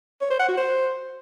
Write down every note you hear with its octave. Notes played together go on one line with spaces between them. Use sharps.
C#5
C5
F#5
F#4
C5